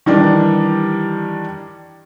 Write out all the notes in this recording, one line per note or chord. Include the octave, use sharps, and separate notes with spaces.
D#3 E3 G3 D4